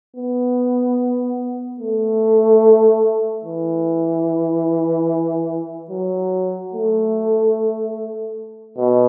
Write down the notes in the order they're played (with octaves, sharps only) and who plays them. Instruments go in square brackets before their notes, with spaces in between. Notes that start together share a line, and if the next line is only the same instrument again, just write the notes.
[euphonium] B3
A3
E3
F#3
A3
B2